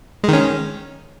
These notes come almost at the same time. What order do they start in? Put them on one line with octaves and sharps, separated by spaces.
G#3 D#3 C#4